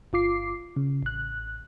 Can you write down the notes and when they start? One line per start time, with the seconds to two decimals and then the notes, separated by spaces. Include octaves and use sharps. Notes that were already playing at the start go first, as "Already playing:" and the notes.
0.13 G1 F4 D6 C7
0.76 C#3
1.03 A1 F#6